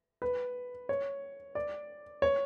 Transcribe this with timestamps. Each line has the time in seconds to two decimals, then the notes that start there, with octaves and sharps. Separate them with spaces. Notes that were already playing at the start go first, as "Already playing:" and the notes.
0.22 B4
0.89 C#5
1.55 D5
2.22 C#5